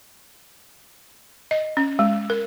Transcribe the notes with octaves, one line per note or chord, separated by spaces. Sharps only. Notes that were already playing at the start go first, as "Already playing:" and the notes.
D#5
C#4
G#3
A#4